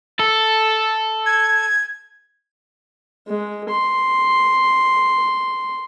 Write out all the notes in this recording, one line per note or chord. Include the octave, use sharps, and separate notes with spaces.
A4
G#6
G#3
C6